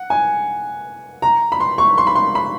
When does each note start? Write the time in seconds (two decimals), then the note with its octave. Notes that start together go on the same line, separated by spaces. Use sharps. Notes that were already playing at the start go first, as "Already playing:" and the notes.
Already playing: F#5
0.10 G#5
1.22 A#5
1.52 B5
1.60 C6
1.78 C#6
1.98 C6
2.07 B5
2.15 C6
2.35 B5